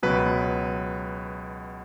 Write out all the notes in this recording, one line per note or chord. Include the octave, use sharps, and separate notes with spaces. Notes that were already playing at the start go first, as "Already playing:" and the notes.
C#2 B2 F#3 B4